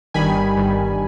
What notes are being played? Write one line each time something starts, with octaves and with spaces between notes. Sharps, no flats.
G1 G2 D#3 G3 G#5 B5
G1 G2 D#3 G3